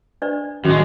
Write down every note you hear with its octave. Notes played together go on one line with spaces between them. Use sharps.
D4 B4 D5
F#2 A2 D#3 G#3 F#4